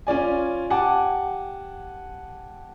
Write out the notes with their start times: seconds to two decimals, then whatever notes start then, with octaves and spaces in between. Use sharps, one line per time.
0.07 C#4 F4 D5 G#5
0.70 G4 F#5 G#5 A5 D6